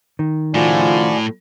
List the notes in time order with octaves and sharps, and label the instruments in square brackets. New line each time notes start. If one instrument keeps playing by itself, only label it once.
[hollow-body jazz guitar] D#3
[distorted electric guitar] A2 [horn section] C#3 F3 F4 [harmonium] F#4 D5 G#5